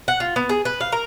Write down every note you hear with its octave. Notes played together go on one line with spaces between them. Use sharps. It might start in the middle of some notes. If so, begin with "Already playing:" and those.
F#5
F4
B3
G#4
B4
F5
A#4